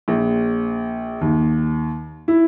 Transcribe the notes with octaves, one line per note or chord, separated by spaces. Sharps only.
A#1
D#2
E4